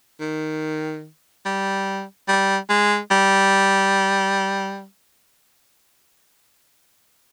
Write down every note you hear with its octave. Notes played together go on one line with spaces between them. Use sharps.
D#3
G3
G3
G#3
G3